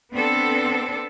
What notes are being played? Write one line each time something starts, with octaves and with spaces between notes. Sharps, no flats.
B3 C4 D4 A4